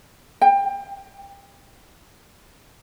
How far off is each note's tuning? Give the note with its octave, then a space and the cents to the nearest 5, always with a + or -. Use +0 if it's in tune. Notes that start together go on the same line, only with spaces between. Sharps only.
G5 +25